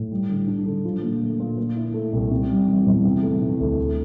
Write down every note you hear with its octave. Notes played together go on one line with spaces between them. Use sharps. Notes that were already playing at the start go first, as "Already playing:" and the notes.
Already playing: A2
G3
D3
D4
D3
F3
A#2
A3
A#2
A#2
E4
A3
C2
C3
G3
E3
E2
C3
A3
E3
D2
A3